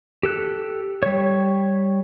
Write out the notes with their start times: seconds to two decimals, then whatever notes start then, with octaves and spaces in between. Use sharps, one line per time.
0.23 G4 A4 F#6
1.03 G3 C#5